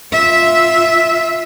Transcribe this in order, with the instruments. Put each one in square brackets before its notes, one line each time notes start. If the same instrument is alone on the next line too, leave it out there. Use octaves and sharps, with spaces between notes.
[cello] F4 E5